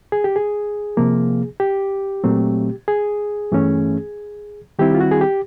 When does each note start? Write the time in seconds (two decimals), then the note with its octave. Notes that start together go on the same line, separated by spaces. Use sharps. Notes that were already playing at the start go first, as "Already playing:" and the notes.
0.12 G#4
0.24 G4
0.36 G#4
0.97 C3 F3 A#3
1.60 G4
2.24 A#2 F#3 A3 C4
2.88 G#4
3.52 G2 E3 A3 C#4
4.79 D#3 G3 C4 E4 G4
4.95 F4
5.01 F#4
5.11 G#4
5.21 G4